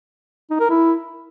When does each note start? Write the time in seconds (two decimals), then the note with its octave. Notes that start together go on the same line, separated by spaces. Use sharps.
0.50 D#4
0.60 A#4
0.70 E4